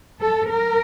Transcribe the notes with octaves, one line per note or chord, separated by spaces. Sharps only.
A4
A#4